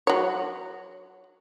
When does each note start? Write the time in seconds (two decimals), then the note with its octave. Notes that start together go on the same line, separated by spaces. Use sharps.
0.07 F#3 C#5